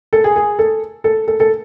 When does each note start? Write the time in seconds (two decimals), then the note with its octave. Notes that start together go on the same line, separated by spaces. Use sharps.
0.13 A4
0.24 G#4
0.36 G#4
0.59 A4
1.04 A4
1.28 A4
1.40 A4